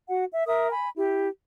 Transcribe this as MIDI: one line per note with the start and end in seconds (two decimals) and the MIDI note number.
0.09 0.25 66
0.09 0.25 78
0.33 0.42 76
0.46 0.70 70
0.46 0.70 76
0.46 0.70 87
0.70 0.89 80
0.70 0.89 83
0.97 1.29 64
0.97 1.29 67